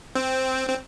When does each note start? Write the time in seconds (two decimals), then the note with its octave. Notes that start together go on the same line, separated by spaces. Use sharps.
0.15 C4
0.69 C4